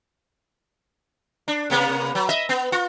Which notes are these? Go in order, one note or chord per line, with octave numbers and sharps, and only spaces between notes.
D4
C3 A#3 B3
F#3
D#5 E5
B3
F4